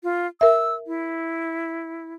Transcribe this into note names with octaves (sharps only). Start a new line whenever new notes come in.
F4
A#4 E5 E6
E4